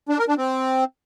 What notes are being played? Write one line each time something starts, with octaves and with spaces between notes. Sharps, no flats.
D4
A#4
D4
C4